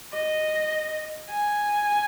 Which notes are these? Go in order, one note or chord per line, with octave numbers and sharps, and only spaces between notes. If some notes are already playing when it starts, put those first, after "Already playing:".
D#5
G#5